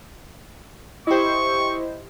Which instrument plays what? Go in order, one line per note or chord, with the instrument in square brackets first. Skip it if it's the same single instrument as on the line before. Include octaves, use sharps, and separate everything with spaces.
[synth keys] E4 C5 [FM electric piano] G4 D#5 [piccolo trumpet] C#6